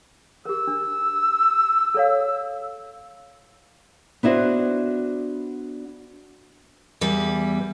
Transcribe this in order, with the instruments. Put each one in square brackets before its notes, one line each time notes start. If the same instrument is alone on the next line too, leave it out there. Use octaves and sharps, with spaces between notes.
[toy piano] G4 A#4 [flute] E6
[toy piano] D4
A4 C#5 F5
[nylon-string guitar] B3 D4 E4 F#4 C5
[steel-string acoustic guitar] E2 G3 B4